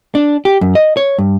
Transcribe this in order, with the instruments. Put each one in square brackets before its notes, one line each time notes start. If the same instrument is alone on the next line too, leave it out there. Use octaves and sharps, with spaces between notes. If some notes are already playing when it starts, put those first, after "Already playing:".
[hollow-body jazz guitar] D4
G4
F#2
D#5
C#5
G2